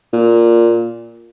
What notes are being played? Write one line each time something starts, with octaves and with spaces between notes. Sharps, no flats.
A#2